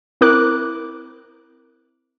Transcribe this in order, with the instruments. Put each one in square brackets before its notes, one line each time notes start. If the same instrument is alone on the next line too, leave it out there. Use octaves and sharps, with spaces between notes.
[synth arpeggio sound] C4 E4 A#4 D6 F#6